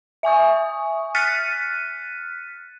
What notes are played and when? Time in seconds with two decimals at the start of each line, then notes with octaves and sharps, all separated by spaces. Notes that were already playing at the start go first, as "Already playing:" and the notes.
0.23 E5 G#5 C#6 D#6
1.15 F6 F#6 A6 B6 C#7 D#7